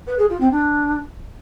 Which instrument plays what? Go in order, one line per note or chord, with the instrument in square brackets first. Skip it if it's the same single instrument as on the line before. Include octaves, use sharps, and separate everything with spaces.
[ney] B4
G#4
F4
C4
D4